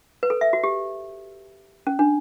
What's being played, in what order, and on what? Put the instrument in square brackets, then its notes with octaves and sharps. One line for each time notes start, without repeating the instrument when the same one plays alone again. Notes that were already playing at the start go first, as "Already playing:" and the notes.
[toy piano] B4
A4
E5
F#4
G4
C#4
D4